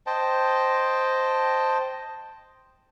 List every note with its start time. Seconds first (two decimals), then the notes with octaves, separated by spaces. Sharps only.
0.07 C5 D#5 G5 A5